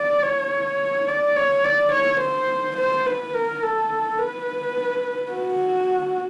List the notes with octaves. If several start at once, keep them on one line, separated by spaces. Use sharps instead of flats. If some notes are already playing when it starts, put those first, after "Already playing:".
Already playing: D5
C#5
D5
C#5
D5
C#5
C5
C5
B4
A#4
A4
B4
F#4